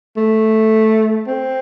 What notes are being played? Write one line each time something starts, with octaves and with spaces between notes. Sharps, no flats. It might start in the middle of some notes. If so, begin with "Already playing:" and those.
A3
C4